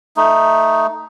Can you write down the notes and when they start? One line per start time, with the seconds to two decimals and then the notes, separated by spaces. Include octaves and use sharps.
0.17 A3 D#4